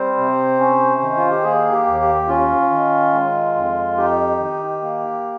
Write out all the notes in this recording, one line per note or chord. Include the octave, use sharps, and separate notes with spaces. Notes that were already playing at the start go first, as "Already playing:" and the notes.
Already playing: G3 C4 C5
C3
C#4
D#3
F4
G4
A#3 G#4
G4
D#2
G4
C#4 F4
D#3
G#3
F2
D#4 G4
D#3
A#3